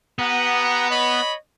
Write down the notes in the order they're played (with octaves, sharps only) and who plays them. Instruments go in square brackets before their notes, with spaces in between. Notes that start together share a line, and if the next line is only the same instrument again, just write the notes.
[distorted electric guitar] B3 [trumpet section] G4 F#5 A#5
[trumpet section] C#5 D#5 B5